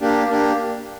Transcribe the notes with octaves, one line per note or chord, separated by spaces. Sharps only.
A#3 D4 G4
A#3 D4 G4